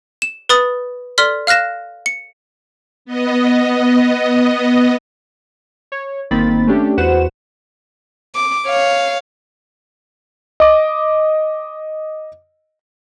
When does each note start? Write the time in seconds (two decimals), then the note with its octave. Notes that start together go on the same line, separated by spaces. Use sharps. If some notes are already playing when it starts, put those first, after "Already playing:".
0.22 E7
0.49 B4 B5 D#6 A6
1.18 A4 D5 C6 F6 B6 G7
1.47 F5 F6 F#6 A#6 E7
2.06 C#7
3.05 B3 D#5
5.92 C#5
6.31 G1 D#3 A#3 C4 B5 A6
6.67 A3 C#4 D4 G4
6.97 E2 F#4 B4 C5 F#5 E7
8.35 D6
8.66 C#5 F5
10.60 D#5 D6